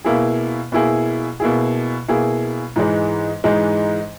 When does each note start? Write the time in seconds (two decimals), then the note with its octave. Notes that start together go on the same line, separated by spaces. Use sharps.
0.05 B2 A#3 E4 G#4
0.72 B2 A#3 E4 G#4
1.40 B2 A#3 E4 G#4
2.08 B2 A#3 E4 G#4
2.76 G#2 E3 G#3 D#4
3.44 G#2 E3 G#3 D#4